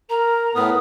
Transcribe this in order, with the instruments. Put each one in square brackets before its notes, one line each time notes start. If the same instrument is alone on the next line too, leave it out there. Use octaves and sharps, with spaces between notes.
[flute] A#4 [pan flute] A#5
[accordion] A2 B3 [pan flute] D#6